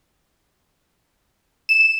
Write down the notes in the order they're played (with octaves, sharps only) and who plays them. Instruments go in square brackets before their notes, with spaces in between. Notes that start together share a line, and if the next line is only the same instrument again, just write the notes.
[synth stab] E7